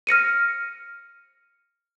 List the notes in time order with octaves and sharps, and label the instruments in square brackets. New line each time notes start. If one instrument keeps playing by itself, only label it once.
[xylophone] F6 A#6 C#7 D#7